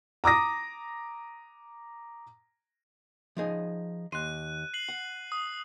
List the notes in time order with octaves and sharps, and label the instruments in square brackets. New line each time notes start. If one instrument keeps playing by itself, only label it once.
[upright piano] A#5 D6 D#6 A#6
[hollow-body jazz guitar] F3 D#4 G#4
[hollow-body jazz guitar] D#2 C6 [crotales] F#6 D#7
[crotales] C7 F#7
[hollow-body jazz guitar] F#5
[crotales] D#6